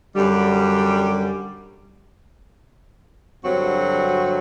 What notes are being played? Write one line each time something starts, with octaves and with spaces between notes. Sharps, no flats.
F#2 D3 G3
G2 D3 F#3 C4 F#4